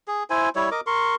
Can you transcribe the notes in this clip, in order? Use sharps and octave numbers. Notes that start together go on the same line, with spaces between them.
G#4
E4 C5 G#5
G3 E4 C#5
A#4 D#5 D6
A#4 C6 C#6